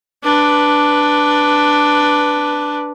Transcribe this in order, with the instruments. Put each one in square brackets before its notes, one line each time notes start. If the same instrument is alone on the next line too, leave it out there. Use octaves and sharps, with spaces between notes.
[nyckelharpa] D4 B4